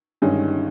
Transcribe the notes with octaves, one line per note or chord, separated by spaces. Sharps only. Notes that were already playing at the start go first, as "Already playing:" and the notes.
G1 G2 D#3 G#3 C#4